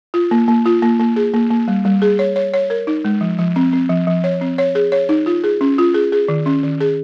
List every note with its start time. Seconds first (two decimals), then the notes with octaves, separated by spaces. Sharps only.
0.14 F4
0.31 A#3
0.48 A#3
0.65 F4
0.82 A#3
0.99 A#3
1.16 G#4
1.34 A#3
1.51 A#3
1.68 G3
1.85 G3
2.02 G#4
2.19 C#5
2.36 C#5
2.54 C#5
2.70 A#4
2.87 D#4
3.05 G#3
3.21 F3
3.38 F3
3.56 C4
3.73 C4
3.90 F3
4.07 F3
4.24 C#5
4.41 C4
4.58 C#5
4.75 G#4
4.92 C#5
5.09 D#4
5.26 F4
5.44 G#4
5.61 C#4
5.78 F4
5.94 G#4
6.12 G#4
6.28 D#3
6.46 C#4
6.63 D#3
6.80 G#4